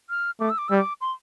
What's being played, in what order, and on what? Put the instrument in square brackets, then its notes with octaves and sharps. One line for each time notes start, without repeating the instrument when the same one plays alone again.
[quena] F6
[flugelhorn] A3 [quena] D6
[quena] E6
D6
[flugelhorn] G3 [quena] E6
[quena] D6
C6